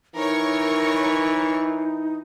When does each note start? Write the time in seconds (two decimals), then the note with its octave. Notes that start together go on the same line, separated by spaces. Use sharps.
0.15 E3 D#4 A#4 C#5 C#6